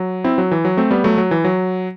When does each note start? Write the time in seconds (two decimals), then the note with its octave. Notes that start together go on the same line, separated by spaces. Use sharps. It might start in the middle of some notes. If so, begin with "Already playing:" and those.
Already playing: F#3
0.24 C4 E4
0.38 F#3
0.51 E3
0.65 F#3
0.77 A3 C4
0.91 G3 B3
1.04 F#3 A3
1.18 F#3
1.31 E3
1.45 F#3